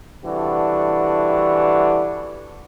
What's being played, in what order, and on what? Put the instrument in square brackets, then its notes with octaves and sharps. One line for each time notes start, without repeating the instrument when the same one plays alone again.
[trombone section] C3 E3 G3 A3 D4 F#4